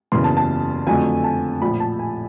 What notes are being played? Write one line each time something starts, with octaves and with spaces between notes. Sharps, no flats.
F#1 E2 C#3 E3 C6
A5
A5
F2 D3 F#3 A3 G#5
A5
A#1 A2 F3 B5
A5
G#5